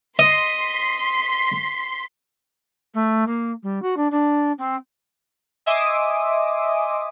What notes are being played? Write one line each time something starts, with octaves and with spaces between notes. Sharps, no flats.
D#5 C6 B6
A3
A#3
G3
F#4
D4
D4
C4
D#5 E5 G#5 C6 D6 D#6